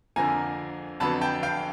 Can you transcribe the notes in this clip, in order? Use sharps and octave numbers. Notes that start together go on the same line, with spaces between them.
F2 D3 F3 A#3 G#5 A#5
F2 D3 F#3 B3 A5 B5
G5 A5
F5 G5